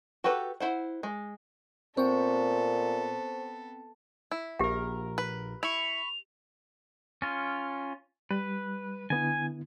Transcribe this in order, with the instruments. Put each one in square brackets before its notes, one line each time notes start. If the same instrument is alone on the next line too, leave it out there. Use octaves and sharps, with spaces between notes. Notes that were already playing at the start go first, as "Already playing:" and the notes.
[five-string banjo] F#4 G4 A4 B4
E4 C5 F#5
G#3
[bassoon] A#2 [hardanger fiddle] B3 A4 [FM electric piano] C4 G5 [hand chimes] C5 C#6
[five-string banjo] E4
[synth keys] A#1 A#4 [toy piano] G4 F#5
[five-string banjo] B4
[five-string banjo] E4 [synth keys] B5 C#6 [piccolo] F7
[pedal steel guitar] C#4 F4
[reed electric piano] G3 [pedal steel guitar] B4
[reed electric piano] D3 B3 E4 [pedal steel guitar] G#5